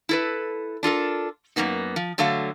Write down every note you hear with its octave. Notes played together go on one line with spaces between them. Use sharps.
E4 A4 B4
D4 F4 A4 A#4
F#2 C3 A#3 B3 D#4
F3
D3 F#3 A3 A4 F5